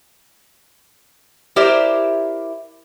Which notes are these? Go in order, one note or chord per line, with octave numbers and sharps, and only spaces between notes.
E4 G4 A#4 C5 D5 E5